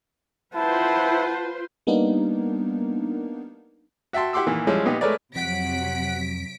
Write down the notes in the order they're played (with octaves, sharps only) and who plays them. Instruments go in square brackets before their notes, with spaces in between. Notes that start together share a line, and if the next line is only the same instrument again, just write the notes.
[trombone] E4 [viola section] F4 B4 C5 [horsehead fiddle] F#5 A5
[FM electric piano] G3 A#3 B3 D4 D#4 A#4
[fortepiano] F#4 E5 G5 A5 C6
E4 G4 F#5 C6 D6 E6
A#2 D#3 E3
F3 G3 G#3 C#4 E4
A#2 B3 D#4 G4
G#3 A3 A#4 B4 C#5 D5
[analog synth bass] F2 [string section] C3 F#3 [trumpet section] F#5 [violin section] B6 D7